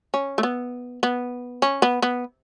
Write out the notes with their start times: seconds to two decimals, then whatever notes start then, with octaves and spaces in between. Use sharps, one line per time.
0.14 C#4
0.38 A3
0.43 B3
1.03 B3
1.62 C#4
1.82 B3
2.02 B3